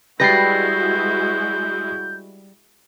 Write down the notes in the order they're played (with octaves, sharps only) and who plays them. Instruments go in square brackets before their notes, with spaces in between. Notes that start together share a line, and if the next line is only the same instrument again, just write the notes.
[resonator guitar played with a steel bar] G3 B4 [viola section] G#3 E4 F#4 [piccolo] G6 [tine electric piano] A#6 C7